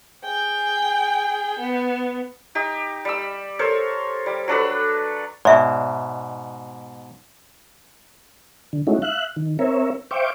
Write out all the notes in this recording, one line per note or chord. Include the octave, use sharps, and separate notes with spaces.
G#4 G5
B3
D#4 G4
G3 E6
A4 A#4 C5 C#5
G3
F#3 D4 A4 B4
G#2 B2 D5 E5
D3
G#3 A3 C#4 D#4 E4 F#4
E5 F5 F#6
D#3
C4 A#4 C#5 E5
C5 E5 F5 G5 C#6 D6